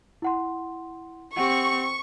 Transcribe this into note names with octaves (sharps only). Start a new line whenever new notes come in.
E4 F#5 C6
C4 G4 F#5 C#6